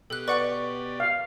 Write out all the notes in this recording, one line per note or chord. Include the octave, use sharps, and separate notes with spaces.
B2 G4 A4 F#6
B4 D5 F#5 C#6 F#6
F5